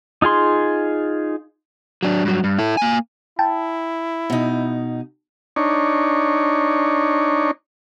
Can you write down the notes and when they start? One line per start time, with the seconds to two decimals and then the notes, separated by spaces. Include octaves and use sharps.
0.22 D#4 F4 G#4 C6
2.03 F#3 D4
2.25 G2 F#3
2.44 G2
2.58 E4 A4
2.77 A#3 G#5
3.39 E4 G5 A5
4.30 B2 D#4
5.56 D4 D#4 C#5